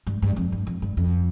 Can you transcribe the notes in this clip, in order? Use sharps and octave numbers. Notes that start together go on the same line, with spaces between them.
G2
G2
F2
G2
F2
G2
F2